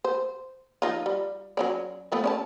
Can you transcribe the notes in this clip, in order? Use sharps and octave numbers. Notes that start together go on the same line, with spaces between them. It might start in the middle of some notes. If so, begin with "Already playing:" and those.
C5
F3 D#4 F4
G3
F#3 C#4 D5
F3 A3 B3
C#4 D5 A5